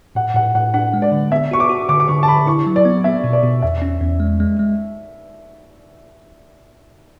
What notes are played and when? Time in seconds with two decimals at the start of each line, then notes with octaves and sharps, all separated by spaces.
0.15 A2 F#5
0.35 A2 F#5
0.55 A2 F#5
0.74 D4 F#5
0.94 G#3
1.02 D5
1.12 D3
1.31 B3 E5
1.51 F#4 C#6
1.60 D6
1.69 F#4
1.89 D3 D6
2.00 D6
2.08 D3 C#6
2.23 A5
2.28 D3 B5
2.47 E4 C#6
2.66 F#3
2.76 D5
2.85 B3
3.04 B3 E5
3.24 B2
3.33 D5
3.43 B2
3.62 E2 E5
3.82 C#4
4.01 E2
4.20 G#3
4.40 G#3
4.60 G#3